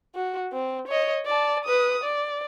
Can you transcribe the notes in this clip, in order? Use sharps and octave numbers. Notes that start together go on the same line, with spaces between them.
F#4
C4
C#5 D#5
D5 A5
B4 D#6
D5